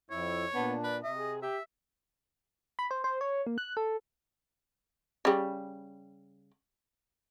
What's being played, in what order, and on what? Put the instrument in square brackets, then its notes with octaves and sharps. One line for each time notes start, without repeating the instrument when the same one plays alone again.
[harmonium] F2 E4 [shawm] C#5
[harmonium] A#2 D4 [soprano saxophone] B3
[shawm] B4 [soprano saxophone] D5
[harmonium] C3 [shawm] D#5 [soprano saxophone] E5
[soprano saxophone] G#4
[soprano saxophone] G4 [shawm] E5
[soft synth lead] B5
C5
C5
C#5
A#3
F#6
A4
[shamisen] C#3 G3